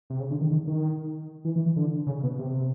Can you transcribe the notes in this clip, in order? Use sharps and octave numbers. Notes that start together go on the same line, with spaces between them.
C3
C#3
D3
D#3
D#3
D#3
E3
E3
E3
D3
C#3
B2
C3